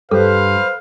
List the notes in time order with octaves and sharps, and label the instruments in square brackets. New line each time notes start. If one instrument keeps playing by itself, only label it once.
[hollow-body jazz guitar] G2 [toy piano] A4 [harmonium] B4 C5 [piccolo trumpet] F5